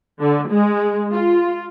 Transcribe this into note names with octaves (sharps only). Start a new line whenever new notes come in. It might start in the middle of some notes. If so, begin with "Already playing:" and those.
D3
G#3
F4